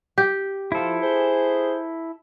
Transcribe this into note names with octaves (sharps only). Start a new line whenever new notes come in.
G4
F3 E4 A4
G#4 C5